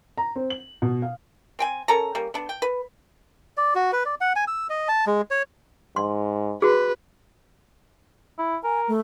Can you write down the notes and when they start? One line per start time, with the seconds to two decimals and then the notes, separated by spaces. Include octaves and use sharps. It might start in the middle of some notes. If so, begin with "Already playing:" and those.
0.18 A#5
0.36 C4
0.50 F#7
0.82 B2
1.02 F5
1.59 C4 G5 G#5
1.88 C#4 A4 A#4 A#5
2.15 G3 A#3 C#4
2.34 B3 D4
2.49 G5
2.62 B4
3.57 D5
3.75 F#4
3.93 B4
4.05 D5
4.21 F#5
4.36 G#5
4.48 E6
4.70 D#5
4.88 A5
5.07 G#3
5.31 C#5
5.96 G#2 C6
6.62 F#4 G#4 B4
8.38 E4
8.64 A#4 G#5
8.88 A3